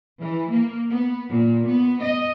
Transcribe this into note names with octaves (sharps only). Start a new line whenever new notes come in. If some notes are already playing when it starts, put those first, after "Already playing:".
E3
A#3
B3
A#2
B3
D#5